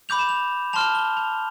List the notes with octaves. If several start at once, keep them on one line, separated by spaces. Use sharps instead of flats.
B5 D6 G6 F7
E7
F7
A5 C6 F6 F7
G7
F7